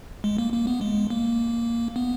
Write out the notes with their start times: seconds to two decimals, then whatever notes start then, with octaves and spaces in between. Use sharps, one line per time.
0.24 G#3
0.38 A#3
0.53 A#3
0.67 B3
0.81 G#3
1.10 A#3
1.96 B3